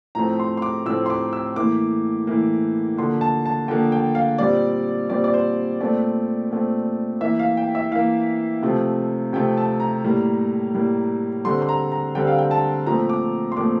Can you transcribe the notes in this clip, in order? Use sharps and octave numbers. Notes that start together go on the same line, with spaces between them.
A2 F3 A3 C4 A#5
C6
C6
D6
A2 F3 A3 C4 E6
C6
D6
E6
A2 E3 A#3 D6
A2 E3 A#3
D3 F3 A#3 C6
A5
A5
D3 F3 A#3 G5
G5
F5
A#2 G3 C4 D5
A#2 G3 C4 D5
D5
C5
A#2 A3 C4 D5
A#2 A3 C4
E3 A#3 E5
F5
G5
E5
E3 A#3 F5
C3 F3 A3 C4
C3 F3 A3 C4 G5
A5
A#5
A2 G3 A#3
A2 G3 A#3
D3 G3 C4 C6
C6
A#5
A#5
D3 G3 C4 G5
F5
G5
A5
A#2 F3 A3 C4 A#5
D6
C6
A#2 F3 A3 C4 D6